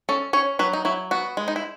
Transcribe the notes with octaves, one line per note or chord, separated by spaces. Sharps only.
C#4 A4
C#4 C#5
F#3 B4
D#4
F#3 E4
B3 F#4
G#3
D#4
E4